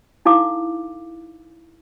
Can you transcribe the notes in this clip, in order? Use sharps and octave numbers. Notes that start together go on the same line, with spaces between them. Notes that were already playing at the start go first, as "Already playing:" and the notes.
D#4 E4 A4 F5 D6